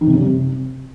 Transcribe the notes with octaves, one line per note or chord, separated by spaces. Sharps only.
D#3
C3
F#2
G3
C3